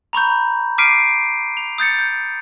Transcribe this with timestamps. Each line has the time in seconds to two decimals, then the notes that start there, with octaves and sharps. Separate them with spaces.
0.13 A#5 B5 C#6 G6
0.78 D6 F6 B6 C7 D7 D#7
1.57 F7
1.78 D#6 G6 A6 C#7
1.99 G6